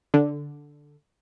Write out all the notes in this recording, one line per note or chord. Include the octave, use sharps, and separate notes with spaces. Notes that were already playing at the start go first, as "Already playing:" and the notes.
D3